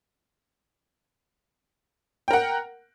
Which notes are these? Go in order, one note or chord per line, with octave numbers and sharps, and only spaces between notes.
A#4 F#5 G5